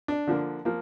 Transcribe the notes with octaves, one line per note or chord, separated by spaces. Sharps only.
D4
D3 F3 A#3
F3 A#3